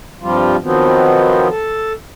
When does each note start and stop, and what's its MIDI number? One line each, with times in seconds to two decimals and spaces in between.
0.21 0.56 43
0.21 0.56 48
0.21 0.56 53
0.21 0.56 55
0.21 0.56 65
0.62 1.48 51
0.62 1.48 53
0.62 1.48 54
0.62 1.48 59
0.62 1.48 60
1.49 1.93 69